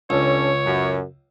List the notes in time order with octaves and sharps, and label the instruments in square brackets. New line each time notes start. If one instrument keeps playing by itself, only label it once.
[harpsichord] C#2 [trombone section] C#4 D4 A4 [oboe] C#5
[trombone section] F#2